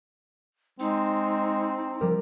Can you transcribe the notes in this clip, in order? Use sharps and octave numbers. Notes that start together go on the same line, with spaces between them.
G#3 C4 D#4
F3 G3 A#4